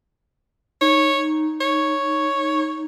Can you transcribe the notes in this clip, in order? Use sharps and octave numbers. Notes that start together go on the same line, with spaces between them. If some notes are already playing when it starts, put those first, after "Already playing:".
D#4 C#5
C#5